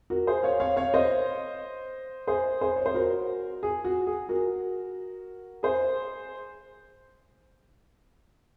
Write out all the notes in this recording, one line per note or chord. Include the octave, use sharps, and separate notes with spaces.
F#4 A#4
G#4 C5
C#5 F5
C#5 F5
C#5 F5
C5 D#5
G#4 C5
G#4 C5
C#5
C5
F#4 A#4
G#4
F#4
G#4
F#4 A#4
G#4 C5